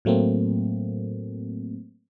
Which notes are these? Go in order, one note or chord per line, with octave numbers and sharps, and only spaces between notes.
A2 F#3 A3 A#3 C4